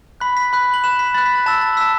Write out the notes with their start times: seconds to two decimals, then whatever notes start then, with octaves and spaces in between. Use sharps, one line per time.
0.20 B5 F#6 B6
0.37 B6
0.53 B5 F#6
0.74 F#7
0.84 B5 F#6 E7
0.99 B6
1.14 B5 F#6 A6
1.26 B6
1.36 A6
1.46 A5 E6 A6
1.61 A6
1.77 A5 E6 B6